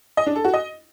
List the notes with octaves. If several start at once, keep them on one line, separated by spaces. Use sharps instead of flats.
D#5
D4
A4
F#4
D#5